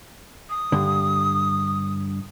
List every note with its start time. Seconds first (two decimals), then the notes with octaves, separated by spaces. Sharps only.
0.50 D#6
0.72 G2 D3